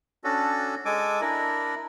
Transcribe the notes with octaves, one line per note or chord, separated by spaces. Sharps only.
C#4 D4 F#4 A4
G#3 A4 G#5 D6
D4 E4 A#4